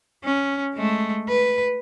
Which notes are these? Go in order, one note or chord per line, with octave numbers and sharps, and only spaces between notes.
C#4
G#3 A3
B4